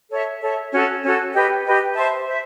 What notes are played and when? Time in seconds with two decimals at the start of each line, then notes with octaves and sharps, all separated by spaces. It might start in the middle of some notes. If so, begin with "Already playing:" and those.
0.10 A4 C#5 E5
0.42 A4 C#5 E5
0.73 C#4 F#4 A4
1.03 C#4 F#4 A4
1.34 G4 B4 D#5 G5
1.65 G4 B4 D#5 G5
1.96 C5 E5 A5 C6
2.27 C5 E5